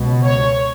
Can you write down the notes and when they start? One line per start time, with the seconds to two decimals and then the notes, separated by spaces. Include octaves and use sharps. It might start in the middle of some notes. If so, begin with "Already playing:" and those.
Already playing: C#2 B2
0.26 C#5